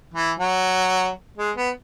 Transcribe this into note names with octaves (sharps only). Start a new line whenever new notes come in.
E3
F#3
G#3
B3